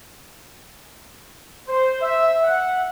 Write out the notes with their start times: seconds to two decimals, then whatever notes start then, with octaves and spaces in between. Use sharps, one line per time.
1.68 C5
2.01 E5
2.44 F#5